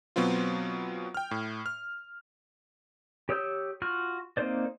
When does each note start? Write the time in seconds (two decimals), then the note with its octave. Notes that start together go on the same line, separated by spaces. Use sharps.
0.16 B2 F#3 B3 C4 F4
1.14 G5 F6
1.31 A2
1.66 F6
3.29 G4 C#5 D#6 E6 G6
3.82 F4 F#4 F6
4.37 A#3 C4 D#4 C5 D5